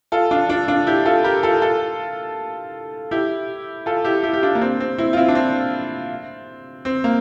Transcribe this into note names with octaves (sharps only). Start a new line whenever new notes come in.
F4 A4
D4 F4
D4 F4
D4 F4
E4 G4
F4 A4
G4 A#4
F4 A4
F4 A4
E4 G4
F4 A4
E4 G4
E4 G4
G4
D4 F4
A#3
C4
C4
C4 E4
F4
C4 E4
D4
C4
C4
A#3